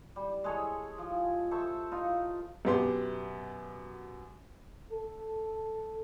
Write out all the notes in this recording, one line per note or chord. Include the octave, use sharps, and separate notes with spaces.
G3
G#3 G#4 A4 C#5
F3
A4 C5 E5 C#6
D#4 F4
F#2 B2 B3 G4 C6
A4